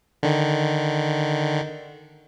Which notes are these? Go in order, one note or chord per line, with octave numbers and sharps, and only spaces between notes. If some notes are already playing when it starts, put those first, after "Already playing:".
D3 D#3